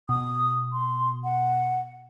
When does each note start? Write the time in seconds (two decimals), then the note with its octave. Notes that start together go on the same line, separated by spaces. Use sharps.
0.09 B2 D#6
0.73 C6
1.24 F#5